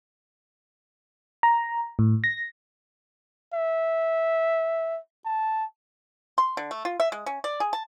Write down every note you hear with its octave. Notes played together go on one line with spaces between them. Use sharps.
A#5
A2
A#6
E5
A5
C6
D3
A3
F4
E5
G#3
C#4
D5
G#4
A5